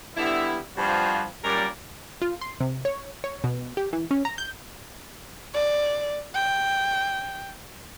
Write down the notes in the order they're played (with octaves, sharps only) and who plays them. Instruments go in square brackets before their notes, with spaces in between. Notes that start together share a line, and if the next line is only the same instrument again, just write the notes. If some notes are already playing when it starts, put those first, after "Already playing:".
[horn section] D3 G3 B3 E4
G2 F3 G3 C4 F4 F#4
F#2 A#2 G3 A#4 D5
[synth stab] F4
C6
C3
C#5
C#5
B2
G4
E3
C#4
A#5
G6
[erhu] D5
G5